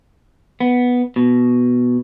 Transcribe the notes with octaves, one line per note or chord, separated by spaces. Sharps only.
B3
B2